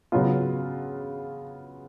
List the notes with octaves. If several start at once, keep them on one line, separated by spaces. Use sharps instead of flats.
C#3 F#3 B3 F4